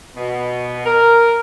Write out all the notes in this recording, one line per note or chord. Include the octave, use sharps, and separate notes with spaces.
B2
A#4